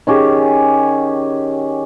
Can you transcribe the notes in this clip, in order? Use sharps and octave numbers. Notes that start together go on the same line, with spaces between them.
D#3 C#4 G4 G#4